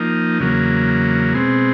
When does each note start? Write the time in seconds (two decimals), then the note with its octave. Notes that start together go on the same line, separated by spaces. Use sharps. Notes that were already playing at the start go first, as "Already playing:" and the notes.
Already playing: F3 A#3 D#4
0.40 E2 C#3 F#3 A#3
1.33 B2 G#3 C4